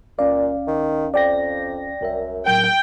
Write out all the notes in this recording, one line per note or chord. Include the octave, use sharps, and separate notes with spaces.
C#2 A#2 C#4 D5 F5
D#3
F2 D5 G5 A#6
C2 F#2 A#4 E5
A2 F#3 A#4 G5